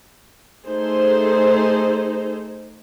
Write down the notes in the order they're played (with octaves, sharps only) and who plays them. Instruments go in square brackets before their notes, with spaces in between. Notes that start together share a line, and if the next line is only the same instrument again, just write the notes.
[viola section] A3 D#4 G#4 A4 C5